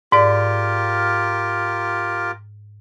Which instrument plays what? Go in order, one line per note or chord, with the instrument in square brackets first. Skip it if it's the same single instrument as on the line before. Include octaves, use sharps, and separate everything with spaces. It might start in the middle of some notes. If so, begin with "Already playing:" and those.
[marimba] G#2 D5 [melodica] F4 G4 A#4